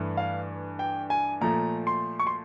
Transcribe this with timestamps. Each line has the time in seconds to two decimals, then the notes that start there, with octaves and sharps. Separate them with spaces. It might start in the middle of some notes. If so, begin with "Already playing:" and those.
Already playing: G2 E3 A3
0.17 F5
0.79 G5
1.10 G#5
1.41 A#2 F3 A3 A#5
1.87 C6
2.20 C#6
2.27 C6